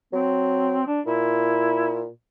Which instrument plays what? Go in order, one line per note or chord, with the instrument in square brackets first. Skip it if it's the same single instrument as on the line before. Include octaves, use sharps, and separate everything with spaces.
[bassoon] F#3 [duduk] C4
[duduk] D4
[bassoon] A#2 [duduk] E4